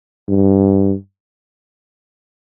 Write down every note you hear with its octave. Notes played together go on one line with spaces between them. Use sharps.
G2